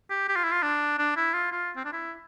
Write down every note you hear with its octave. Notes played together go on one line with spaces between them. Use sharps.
G4
G4
F4
E4
F4
D4
D4
E4
F4
F4
C4
D4
E4